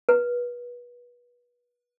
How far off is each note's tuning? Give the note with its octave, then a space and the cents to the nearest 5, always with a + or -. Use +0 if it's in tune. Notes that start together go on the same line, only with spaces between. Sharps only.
B4 -30